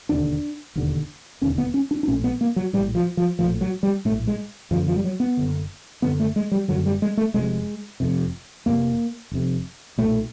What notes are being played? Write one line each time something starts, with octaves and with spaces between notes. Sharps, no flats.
E1 D#2 D3 D4
E1 D#2 D3
E1 D#2 D3 C#4
B3
C#4
D4
D4
A#1 A2 C#4
B3
A#3
F#3
A#1 A2 G3
F3
F3
A#1 A2 F3
F#3
G3
A#1 A2 A3
G#3
F#1 F#2 D3 F3
F3
G3
F#3
B3
F#1 F#2 D3
F#1 F#2 D3 B3
A3
G#3
G3
F#1 F#2 D3 F#3
G3
G#3
A3
F1 F2 C3 G#3
F1 F2 C3
F1 F2 C3 A#3
F1 F2 C3
B1 A#2 A3